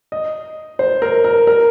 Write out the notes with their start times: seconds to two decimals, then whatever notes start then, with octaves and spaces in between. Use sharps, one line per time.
0.12 D#5
0.79 C5
1.02 A#4
1.24 A#4
1.47 A#4